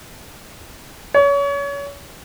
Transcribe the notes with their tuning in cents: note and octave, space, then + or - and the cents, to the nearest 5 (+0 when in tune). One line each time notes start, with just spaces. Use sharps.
C#5 +30